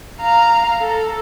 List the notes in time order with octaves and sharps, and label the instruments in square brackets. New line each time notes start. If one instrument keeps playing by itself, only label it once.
[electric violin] F5 A#5
A4